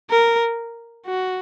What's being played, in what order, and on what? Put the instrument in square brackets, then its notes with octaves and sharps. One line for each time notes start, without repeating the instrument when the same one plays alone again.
[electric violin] A#4
F#4